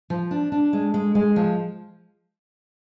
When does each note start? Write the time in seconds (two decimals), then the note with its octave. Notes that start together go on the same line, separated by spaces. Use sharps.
0.10 F3
0.31 D4
0.52 D4
0.73 G#3
0.94 G#3
1.15 G#3
1.36 F3